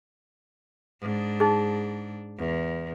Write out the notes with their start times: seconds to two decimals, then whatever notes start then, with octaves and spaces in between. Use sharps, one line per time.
1.01 G#2 D4
1.40 D#4 G#4
2.38 E2